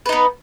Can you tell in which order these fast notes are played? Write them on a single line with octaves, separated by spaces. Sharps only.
B4 D#4 B3